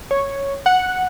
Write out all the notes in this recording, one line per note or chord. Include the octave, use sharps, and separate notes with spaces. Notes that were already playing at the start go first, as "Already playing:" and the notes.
C#5
F#5